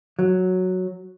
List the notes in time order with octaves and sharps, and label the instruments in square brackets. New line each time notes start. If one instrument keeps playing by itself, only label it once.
[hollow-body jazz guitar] F#3